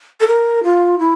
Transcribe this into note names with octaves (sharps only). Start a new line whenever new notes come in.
A4
A#4
F4
E4